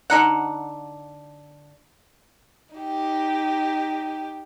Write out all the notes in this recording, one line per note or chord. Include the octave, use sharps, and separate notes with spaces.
D3 D#4 F#5
D#4 G4